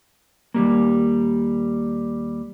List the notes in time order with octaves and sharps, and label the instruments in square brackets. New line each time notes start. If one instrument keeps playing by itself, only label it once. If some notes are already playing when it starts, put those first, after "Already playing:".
[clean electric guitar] D#2 G3 A#3